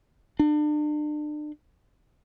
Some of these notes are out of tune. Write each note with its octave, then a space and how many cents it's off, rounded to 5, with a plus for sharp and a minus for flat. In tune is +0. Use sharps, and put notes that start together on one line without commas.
D4 +35